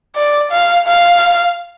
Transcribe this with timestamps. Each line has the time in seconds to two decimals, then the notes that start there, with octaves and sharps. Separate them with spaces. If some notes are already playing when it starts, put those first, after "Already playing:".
0.16 D5
0.52 F5
0.88 F5